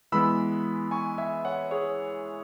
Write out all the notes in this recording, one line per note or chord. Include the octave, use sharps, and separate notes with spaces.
E3 G#3 B3 B5 E6
G#5 C#6
E5 G#5
C#5 F#5
G#4 C#5